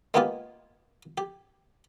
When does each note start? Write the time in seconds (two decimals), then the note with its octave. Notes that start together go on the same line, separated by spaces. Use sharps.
0.14 G#3 A#3 B3 D#4 F4 G4
1.18 G4